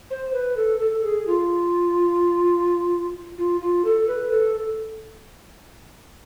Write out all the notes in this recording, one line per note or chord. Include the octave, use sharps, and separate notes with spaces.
C5
B4
A4
A4
G#4
F4
F4
F4
A4
B4
A4